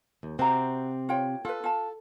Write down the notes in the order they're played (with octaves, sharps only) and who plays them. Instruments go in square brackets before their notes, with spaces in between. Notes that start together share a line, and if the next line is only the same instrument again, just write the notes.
[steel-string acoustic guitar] D#2
[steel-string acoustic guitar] C3 C4 [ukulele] F#4 A#5
[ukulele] F4 C#5 G5
[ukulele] F4 B4 [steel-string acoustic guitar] A4
[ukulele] F4 A5